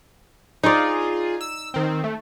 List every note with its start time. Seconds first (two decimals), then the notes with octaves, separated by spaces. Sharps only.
0.63 D#4 F4 G#4 D5
1.41 E6
1.74 D#3 C4
2.04 A3